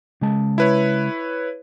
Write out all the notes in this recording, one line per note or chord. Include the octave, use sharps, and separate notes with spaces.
C#3 G#3 A5
E4 B4 C#5